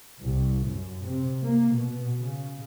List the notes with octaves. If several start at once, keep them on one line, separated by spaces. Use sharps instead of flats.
C2
F#2
C3
A#3
B2
C#3